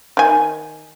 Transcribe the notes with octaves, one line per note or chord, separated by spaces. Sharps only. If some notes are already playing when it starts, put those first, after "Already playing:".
D#3 G#5